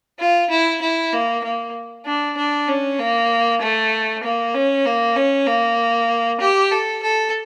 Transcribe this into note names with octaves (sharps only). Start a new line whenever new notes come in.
F4
E4
E4
A#3
A#3
D4
D4
C#4
A#3
A3
A#3
C#4
A#3
C#4
A#3
G4
A4
A4